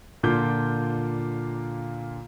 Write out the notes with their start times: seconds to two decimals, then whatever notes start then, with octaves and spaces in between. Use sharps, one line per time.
0.23 A#2 D3 A#3 F4 D6 G6